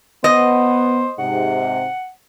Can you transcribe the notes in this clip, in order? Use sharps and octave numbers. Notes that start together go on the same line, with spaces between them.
B3 C5 D#5
G#2 C3 F#5